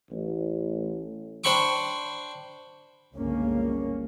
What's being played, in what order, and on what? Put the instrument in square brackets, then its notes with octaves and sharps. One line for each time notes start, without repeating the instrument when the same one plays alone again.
[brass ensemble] A1
[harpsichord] D4 C5 G5 B5 C#6 D6
[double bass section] G1 C#2 A#3 C#4